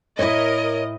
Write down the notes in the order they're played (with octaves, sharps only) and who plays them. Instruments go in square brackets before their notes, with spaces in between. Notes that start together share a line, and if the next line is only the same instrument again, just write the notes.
[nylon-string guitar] A2 E4 [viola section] A#4 D#5 [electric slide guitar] C#5